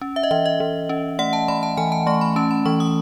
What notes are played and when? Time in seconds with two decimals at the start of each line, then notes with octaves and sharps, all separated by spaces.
0.01 C#4
0.16 E5
0.23 D#5
0.31 E3 E5
0.46 D#5
0.60 E3
0.89 C#4
1.19 A3 F#5
1.33 A5
1.48 A3 B5
1.63 A5
1.77 E3 G#5
1.92 A5
2.07 A3 C#6
2.21 B5
2.36 C#4 A5
2.51 B5
2.66 E3 C#6
2.80 D#6